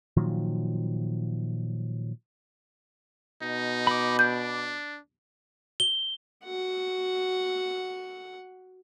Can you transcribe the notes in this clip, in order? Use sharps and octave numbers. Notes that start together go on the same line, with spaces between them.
A#2 D#3 F3 F#3
B2 D#4
B5 D6
D4 G6
G7
F#4 F#5